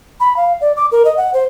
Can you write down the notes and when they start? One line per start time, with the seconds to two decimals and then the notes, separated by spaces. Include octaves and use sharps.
0.20 B5
0.36 F5
0.61 D5
0.76 D6
0.92 A#4
1.05 D#5
1.17 F#5
1.34 C5